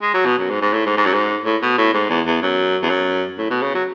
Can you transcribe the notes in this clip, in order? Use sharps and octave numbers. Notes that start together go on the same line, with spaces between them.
G#3
F#3
B2
F#2
G#2
G#2
A2
G#2
G#2
F#2
G#2
A2
B2
A2
G#2
E2
E2
F#2
E2
F#2
A2
B2
C#3
F#3